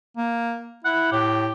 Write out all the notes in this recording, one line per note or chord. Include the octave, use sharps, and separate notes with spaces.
A#3
E4 F#5
A2 G4